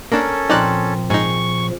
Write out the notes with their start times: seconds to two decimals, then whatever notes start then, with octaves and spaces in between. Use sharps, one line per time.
0.12 A#3 C#4 D4 A4 A#4
0.50 A#2 F3 C4 D#4 A#4 C5 D5 F#6
1.10 G#2 D#4 G#4 C#6